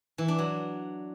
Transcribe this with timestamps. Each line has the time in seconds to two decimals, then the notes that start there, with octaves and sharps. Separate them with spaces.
0.18 E3
0.28 D4
0.38 F#3